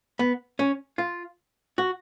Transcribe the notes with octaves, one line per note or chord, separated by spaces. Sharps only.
B3
C#4
F4
F#4